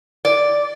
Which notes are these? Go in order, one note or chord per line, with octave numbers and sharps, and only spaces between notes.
D5